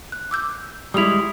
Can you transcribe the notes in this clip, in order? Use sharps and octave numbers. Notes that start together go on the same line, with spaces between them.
F#6
D6 E6 G6
G3 G#3 E4 D#6 F7